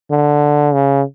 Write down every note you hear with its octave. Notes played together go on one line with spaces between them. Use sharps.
D3
C#3